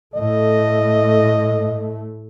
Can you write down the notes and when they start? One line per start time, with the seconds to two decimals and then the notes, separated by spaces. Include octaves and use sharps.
0.15 A2 A3 D#5